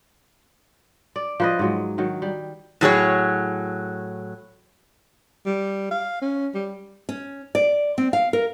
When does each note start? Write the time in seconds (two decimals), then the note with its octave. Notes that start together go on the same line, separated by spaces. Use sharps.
1.16 D5
1.40 F3 B4 D#5
1.59 G#2 F#3 G#3
1.98 D#3 F#3
2.22 G3
2.81 A2 F#3 G#4 C#5
5.46 G3
5.91 F5
6.21 C#4
6.54 G3
7.09 C#4
7.55 D5
7.98 C4
8.13 F5
8.33 A#4